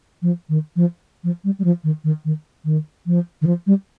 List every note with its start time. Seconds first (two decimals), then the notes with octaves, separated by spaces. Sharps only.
0.22 F3
0.49 D#3
0.76 F3
1.24 F3
1.44 G3
1.59 G3
1.64 F3
1.84 D#3
2.04 D#3
2.25 D#3
2.65 D#3
3.06 F3
3.42 D#3
3.47 F3
3.67 G3